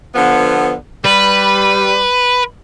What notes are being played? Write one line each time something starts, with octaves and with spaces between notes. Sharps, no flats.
D3 F3 B3
G3 B4